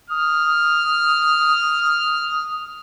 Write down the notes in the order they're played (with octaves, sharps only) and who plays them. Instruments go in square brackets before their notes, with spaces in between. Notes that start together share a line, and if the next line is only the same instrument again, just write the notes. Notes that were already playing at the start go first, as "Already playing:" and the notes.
[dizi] D#6 [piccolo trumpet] F6